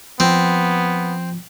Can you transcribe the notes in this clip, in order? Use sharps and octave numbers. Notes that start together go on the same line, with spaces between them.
F3 B3 C4